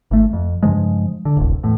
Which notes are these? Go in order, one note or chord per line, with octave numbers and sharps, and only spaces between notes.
G#1 A3
F2
G2 C#3 F3 G#3
D3
D1 G1 C2
E2 A2